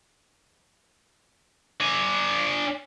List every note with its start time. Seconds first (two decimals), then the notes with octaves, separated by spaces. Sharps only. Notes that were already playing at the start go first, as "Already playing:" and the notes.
1.80 D4 G#5